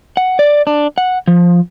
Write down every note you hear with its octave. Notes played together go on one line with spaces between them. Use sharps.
F#5
D5
D4
F#5
F3